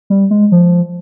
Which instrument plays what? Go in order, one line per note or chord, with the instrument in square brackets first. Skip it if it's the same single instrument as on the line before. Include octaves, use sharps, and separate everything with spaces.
[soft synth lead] G3
G#3
F3